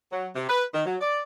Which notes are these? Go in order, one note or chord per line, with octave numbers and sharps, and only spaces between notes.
F#3
C3
B4
D#3
F#3
D5